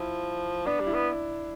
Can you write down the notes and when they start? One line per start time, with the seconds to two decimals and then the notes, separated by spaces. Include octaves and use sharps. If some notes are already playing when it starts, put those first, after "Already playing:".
Already playing: F3 E4
0.66 B3 D4
0.80 G3
0.87 E4
0.94 B3